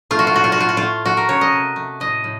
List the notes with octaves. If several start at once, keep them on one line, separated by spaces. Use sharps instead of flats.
A3 F4
F#4
F4
A2 F#4
F4
F#4
A3 F4
F#4
A3 F4
A3 F#4
A#4
C#3 C#5
D#5
C3
A3
A2 D#5
A2